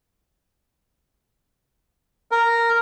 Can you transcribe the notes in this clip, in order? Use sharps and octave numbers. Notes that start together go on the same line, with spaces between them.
A#4